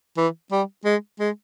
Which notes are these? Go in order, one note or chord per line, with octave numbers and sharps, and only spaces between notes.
E3
G3
G#3
G#3